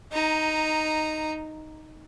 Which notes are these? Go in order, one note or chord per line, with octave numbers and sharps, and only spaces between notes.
D#4 A#5